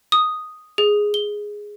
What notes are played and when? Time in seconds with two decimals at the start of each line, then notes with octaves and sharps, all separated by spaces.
0.12 D#6
0.78 G#4
1.14 G7